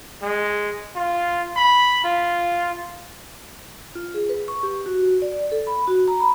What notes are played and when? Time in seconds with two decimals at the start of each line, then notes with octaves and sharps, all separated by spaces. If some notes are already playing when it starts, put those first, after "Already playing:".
0.23 G#3
0.96 F4
1.57 B5
2.04 F4
3.95 F4
4.14 G#4
4.29 B4
4.48 C#6
4.63 G4
4.86 F#4
5.22 D5
5.52 A4
5.67 B5
5.88 F#4
6.08 A#5
6.20 B5